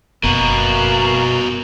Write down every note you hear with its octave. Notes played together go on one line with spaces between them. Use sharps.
F#1 B2 A#3 F#4 A#4